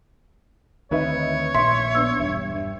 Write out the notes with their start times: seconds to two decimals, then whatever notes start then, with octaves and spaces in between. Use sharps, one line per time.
0.91 D2 D#3 C4 D#4 B4 C#5 E5
1.55 A#1 A#2 E5 C6 B6 C#7
1.95 B3 D4 E6
2.20 E1 G2 E5
2.55 G2